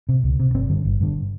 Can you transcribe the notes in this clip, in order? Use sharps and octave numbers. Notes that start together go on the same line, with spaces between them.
C3
C#2
C3
G1 C4
G2 D3
G1
G2 D3